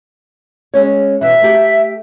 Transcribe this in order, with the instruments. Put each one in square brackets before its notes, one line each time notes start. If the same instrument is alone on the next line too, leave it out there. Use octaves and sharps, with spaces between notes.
[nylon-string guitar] G#3 C#4 C#5
[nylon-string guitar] B2 E3 [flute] E5
[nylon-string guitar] A3 G4